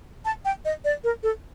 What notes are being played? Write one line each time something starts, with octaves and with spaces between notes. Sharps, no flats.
A5
G5
D#5
D5
A#4
A4